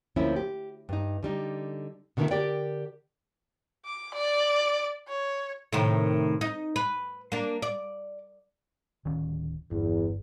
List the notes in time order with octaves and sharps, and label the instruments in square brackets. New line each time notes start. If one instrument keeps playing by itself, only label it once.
[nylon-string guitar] D2 F3 A#3 C4 C#4 E4
G4
G2 D#4
D3 G3 D#4
B2 D3 D#3 A#3 B3 E4
D3 G4 A#4 D5 G5
[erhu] D6
D5
C#5
[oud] A2 C3 D#3
D#4
B4
A#3 D4
D5
[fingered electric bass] D1 D#3 C#4
[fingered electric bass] G1 [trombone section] E2